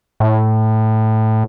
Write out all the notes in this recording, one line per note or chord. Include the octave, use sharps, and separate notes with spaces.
A2